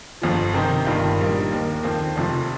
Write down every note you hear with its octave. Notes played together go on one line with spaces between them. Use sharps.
G1 F2 F3
C3 D#3 C4 D#4 C5
G1 G2 D#3 A#3 F4
A#1 A#2 G3 A#3 D#4
D#2 D#3 A#3
F2 D#3 C4
F1 F2 C3 F3